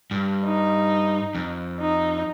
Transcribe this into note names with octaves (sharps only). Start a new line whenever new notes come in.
G2
D#4
F2
D#4